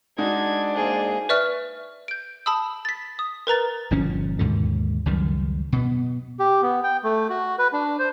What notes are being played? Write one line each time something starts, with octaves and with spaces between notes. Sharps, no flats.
G#3 D4 D#4 F#4 G#6
A#3 G#4 C5
B4 D5 E5 C#6 F6
G6 D7
A5 B5 D#6 E6
A6 B6
D#6
A#4 B4 A#5 A6
G1 A#2 F3 C#4
D#2 G#2 B2 D3
C#2 F#2 D#3 G3
B2 B3
G4
B3
G5
A3
F#4
B4
D4
C5